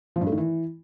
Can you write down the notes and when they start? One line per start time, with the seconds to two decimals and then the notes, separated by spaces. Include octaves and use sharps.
0.16 F3
0.21 G2
0.27 A3
0.32 D#3
0.38 E3